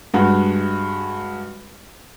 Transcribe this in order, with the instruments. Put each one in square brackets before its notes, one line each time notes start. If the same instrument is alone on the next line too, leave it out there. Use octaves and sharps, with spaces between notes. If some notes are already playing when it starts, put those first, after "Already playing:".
[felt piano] G2 G#3 F#4